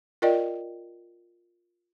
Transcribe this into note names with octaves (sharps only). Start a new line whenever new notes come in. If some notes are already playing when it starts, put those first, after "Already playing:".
F4 A#4 D5 D#5 G5